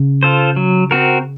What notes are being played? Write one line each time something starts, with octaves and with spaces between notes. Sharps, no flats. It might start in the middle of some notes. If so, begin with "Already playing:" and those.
Already playing: C#3
F4 A4 C5
F#3
C4 F#4 A#4